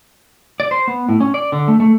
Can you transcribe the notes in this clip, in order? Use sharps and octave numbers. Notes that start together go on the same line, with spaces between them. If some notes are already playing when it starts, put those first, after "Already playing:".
D5
C5
B3
A2
C#4
D5
D3
A3
A3